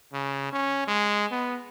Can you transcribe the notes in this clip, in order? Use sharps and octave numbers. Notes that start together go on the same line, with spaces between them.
C#3
C#4
G#3
B3